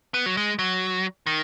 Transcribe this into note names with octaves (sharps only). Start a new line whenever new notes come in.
B3
F#3
G#3
F#3
D#3